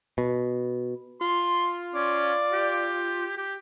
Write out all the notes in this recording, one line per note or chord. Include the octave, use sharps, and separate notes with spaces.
B2
F4 C6
C#4 D5
G4
G4